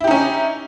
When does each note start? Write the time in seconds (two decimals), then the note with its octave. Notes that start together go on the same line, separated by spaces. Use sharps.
0.01 E4
0.04 G4
0.07 D#4
0.11 C#4